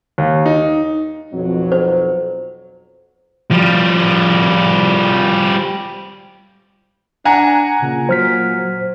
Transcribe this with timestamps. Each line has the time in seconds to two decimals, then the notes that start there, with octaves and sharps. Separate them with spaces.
0.18 D#2
0.46 D#4
1.33 B1 F2 F#3
1.72 C5
3.51 F3 G3
7.25 D4 F#5 G#5 A#5
7.81 A#2 C#3
8.09 F#3 C5 F6 B6